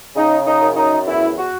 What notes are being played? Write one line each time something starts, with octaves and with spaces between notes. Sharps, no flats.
C#3 D#4
D#4
F#2
D#4
E2 E4
F#4